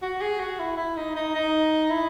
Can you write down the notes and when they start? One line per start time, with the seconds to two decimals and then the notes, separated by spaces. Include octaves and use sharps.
0.02 F#4
0.21 G#4
0.40 F#4
0.59 E4
0.77 E4
0.97 D#4
1.16 D#4
1.35 D#4
1.90 E4